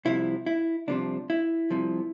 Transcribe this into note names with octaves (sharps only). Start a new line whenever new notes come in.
C2 C3 F3 E4
E4
C2 C3 F3 D4
E4
C2 C3 F3